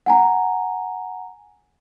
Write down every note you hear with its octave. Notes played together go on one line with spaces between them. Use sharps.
F#5 G#5 A#5